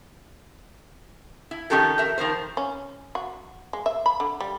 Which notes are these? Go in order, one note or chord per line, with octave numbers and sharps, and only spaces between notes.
E4
D#3 F3 C#4 G4 A4 A#4
A#4 E5
D#3 F3 A#4 C5
C#4
F#4
G#3
E5
B5
D3
G3